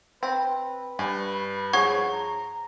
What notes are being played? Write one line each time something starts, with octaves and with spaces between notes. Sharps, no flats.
C4 B4
G2 G#5
F3 G#4 C#5 F#5 C#6 G#6
A#5